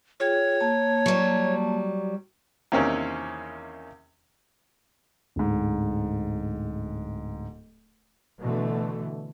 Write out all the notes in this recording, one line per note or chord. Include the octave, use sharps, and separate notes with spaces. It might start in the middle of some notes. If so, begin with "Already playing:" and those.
F4 G#4 C#5 G5
A#3 A5
F#3 G3
E2 C3 D#3 A#3 C4 C#4
D1 G#2
B2 D3 E3 A3